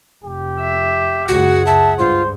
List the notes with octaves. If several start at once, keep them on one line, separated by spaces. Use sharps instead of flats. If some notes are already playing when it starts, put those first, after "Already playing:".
F1 G4
E5
C#2 F#2 F#4 G#4 F#5
E5 A5
G2 F4 C5